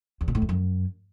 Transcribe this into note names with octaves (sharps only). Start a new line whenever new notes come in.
E2
B2
A2
F2
F#2